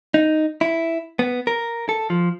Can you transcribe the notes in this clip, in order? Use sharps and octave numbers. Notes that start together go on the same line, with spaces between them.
D#4
E4
B3
A#4
A4
F3